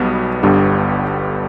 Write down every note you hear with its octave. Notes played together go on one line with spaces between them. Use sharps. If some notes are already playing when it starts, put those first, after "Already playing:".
Already playing: B1 B2 G3 B3
G1 G2 D3 G3 B3